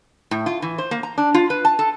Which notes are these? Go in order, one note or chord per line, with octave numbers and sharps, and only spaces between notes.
A2
F4
E3
C5
A#3
A#5
D4
F4
B4
A5
A4